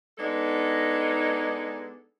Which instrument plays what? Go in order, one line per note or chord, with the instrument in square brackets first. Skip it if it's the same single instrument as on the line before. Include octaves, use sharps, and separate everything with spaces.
[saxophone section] G#3 B3 D4 D#4 A4